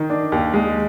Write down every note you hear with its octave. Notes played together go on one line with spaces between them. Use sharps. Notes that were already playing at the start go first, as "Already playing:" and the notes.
Already playing: D#3
D4
D#2
G#3